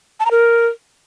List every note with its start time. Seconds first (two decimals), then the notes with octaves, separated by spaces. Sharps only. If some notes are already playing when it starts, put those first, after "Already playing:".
0.20 A5
0.25 A#5
0.31 A#4